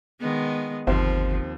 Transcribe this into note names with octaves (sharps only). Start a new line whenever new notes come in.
D#3 G#3 B3
G1 D#2 F3 C4